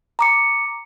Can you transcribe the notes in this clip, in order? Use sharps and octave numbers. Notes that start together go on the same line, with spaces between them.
A#5 D6 C#7